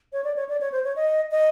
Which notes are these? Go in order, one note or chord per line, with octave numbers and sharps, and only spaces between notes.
C#5
D5
C#5
D5
C#5
C5
C#5
D#5
D#5